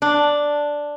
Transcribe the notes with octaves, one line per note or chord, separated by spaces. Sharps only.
D4